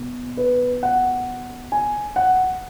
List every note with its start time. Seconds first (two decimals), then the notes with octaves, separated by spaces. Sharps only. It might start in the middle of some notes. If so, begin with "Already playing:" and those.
Already playing: B2
0.37 B4
0.83 F#5
1.72 G#5
2.16 F#5